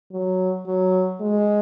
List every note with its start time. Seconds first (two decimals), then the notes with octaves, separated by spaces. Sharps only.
0.11 F#3
0.66 F#3
1.21 G#3